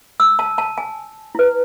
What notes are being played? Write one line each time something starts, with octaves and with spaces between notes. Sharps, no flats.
E6
A5
A5
G#5
E4 B4